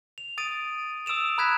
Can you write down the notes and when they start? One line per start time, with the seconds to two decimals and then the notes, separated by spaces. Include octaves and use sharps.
0.18 F7
0.38 D#6 A6 D7 D#7
1.06 D#6 E6 D7 E7 F7
1.38 A#5 B5 F#6 G#6 B6 E7